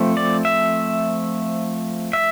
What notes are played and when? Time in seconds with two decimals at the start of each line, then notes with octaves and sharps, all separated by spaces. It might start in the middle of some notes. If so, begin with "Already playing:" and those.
Already playing: F3 A3 C4
0.17 D5
0.45 E5
2.13 E5